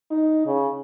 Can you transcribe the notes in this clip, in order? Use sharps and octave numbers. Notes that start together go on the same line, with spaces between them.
D#4
C#3